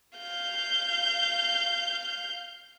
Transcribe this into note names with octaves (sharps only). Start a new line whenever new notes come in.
F5 G6